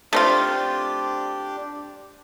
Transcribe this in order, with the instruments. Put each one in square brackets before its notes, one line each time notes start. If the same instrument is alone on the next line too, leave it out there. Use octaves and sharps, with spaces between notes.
[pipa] A3 C4 F4 [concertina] D4 G4